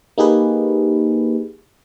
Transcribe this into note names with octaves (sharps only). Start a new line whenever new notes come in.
A#3 D#4 G4 G#4 B4